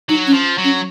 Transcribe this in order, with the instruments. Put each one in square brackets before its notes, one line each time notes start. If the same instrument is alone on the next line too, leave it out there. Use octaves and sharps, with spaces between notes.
[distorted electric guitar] F#3 [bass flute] D#4
[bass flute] C#4
[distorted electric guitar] F3
F#3
[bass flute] C#4